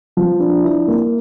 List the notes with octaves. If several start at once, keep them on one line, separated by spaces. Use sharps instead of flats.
F3
D4
E4
A#3